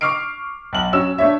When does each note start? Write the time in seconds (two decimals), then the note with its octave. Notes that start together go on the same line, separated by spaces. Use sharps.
0.01 C#6 D6 F6 C7 D7
0.73 B1 F#7
0.93 F#3 C#4 E6 E7
1.18 A3 D4 C#5 E5